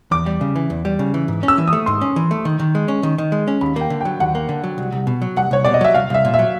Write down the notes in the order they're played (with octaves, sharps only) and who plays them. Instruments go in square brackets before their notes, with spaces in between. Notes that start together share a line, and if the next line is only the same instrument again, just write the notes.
[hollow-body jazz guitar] E2 [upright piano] D6
[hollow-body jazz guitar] G3
C#3
E3
E2
G3
C#3
E3
G#2
C#4
[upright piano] E6
[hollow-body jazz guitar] E3
[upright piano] D#6
[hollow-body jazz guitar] A3
[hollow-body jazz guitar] G#2 [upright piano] C6
[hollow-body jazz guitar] C#4
E3
A3
D#3
D#3
G#3
C#4
D#3
D#3
G#3
C#4
[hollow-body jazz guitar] D#2 [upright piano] B5
[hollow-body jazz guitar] A#3 [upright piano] G5
[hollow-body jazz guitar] D3
[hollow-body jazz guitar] F#3 [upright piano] G5
[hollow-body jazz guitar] D#2 [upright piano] F#5
[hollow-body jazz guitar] A#3
D3
F#3
C2
C2
B2
F#3
[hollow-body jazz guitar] C2 [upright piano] F#5
[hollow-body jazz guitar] C2 [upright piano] C#5
[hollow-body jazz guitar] B2 [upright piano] D5
[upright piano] D#5
[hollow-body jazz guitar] F#3 [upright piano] E5
[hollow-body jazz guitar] C2 [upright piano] F5
[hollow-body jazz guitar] C2 [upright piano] E5
[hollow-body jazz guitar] A#2
[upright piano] E5
[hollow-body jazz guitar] F#3